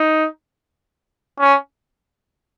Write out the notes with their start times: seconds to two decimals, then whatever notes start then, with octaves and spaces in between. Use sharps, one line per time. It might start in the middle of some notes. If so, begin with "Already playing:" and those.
Already playing: D#4
1.39 C#4